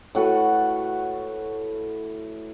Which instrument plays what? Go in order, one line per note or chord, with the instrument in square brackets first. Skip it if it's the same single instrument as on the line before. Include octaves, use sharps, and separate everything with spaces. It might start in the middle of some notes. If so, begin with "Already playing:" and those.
[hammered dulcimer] A2 F#4 A4 B4